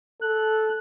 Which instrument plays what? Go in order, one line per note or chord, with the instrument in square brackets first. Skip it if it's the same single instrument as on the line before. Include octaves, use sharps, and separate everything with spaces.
[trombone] A4 [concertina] F#6